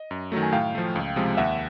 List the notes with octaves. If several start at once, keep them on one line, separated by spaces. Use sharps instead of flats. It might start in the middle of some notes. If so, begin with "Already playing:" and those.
Already playing: D#5
F#2
D#3 F#3 A3
G#5
A2 F5 G5
F3 A3
C#2
C3 F3 G#3
D#2 E5 F#5